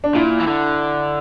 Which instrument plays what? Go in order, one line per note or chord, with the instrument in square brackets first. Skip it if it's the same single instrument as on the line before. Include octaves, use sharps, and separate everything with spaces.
[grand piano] D4
[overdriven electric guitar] A#2 [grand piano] E4
[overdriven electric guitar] E3
D3